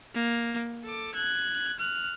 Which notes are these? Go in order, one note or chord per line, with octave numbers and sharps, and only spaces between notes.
A#3
A4 D6
F#6 G#6
F6 F#6